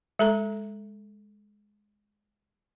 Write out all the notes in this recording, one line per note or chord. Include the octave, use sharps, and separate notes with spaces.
G#3 A4 A#5